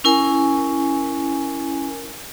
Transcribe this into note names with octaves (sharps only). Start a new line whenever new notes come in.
C#4 E4 A#4 G#5